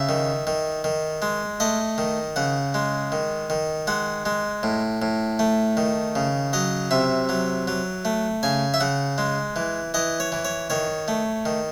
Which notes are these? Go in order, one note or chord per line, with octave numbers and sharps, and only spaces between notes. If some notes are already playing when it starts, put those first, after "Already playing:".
Already playing: C#3 E5
D#3
D#3
D#3
G#3
A3 D#5
D#3
C#3 F#5
G#3
D#3
D#3
G#3 F#5
G#3
A2
A2
A3
D#3
C#3
F#3 D#5
C3 E5
F#3
F#3
A3
C#3 G#5
E5
C#3 F#5
G#3
E3
E3 D#5
C#5
E3
C#5
D#3 C#5
A3
D#3